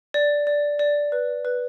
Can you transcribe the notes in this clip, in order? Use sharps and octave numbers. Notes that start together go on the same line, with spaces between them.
D5
D5
D5
B4
B4